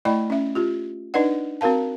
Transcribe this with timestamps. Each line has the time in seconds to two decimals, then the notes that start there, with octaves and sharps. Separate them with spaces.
0.05 A3 E4 D5 D#5 G5 B5
0.30 C#4 E5
0.55 F4 G4
1.14 D4 D#4 B4 D5 D#5 F#5
1.61 C4 F#4 A#4 F5 A5